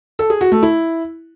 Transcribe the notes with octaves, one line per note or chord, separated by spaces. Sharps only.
A4
G#4
F#4
A3
E4